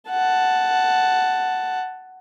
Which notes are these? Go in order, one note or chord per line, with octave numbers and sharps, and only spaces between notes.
F#5 A5